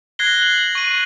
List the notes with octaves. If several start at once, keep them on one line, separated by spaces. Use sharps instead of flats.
F#6 G#6 A#6 C7 G7
G#6 F#7
C#6 D#7